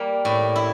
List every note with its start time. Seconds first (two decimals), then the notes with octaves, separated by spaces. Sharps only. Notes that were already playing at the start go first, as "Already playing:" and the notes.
Already playing: G3 A#3
0.25 A2
0.56 E4